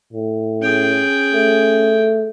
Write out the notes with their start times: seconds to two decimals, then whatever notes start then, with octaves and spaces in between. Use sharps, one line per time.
0.13 A2
0.62 C#4 G#4 G5
1.34 A3